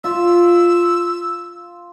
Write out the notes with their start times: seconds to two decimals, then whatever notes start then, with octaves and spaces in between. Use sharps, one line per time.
0.04 F4 E6